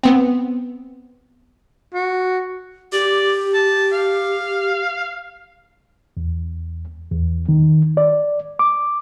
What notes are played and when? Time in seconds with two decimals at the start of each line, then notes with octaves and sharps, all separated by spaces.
0.03 B3 C4
1.94 F#4
2.92 G4 D5
3.54 A5
3.92 F5
6.17 E2
7.11 E2
7.49 D#3
7.97 D5
8.59 D6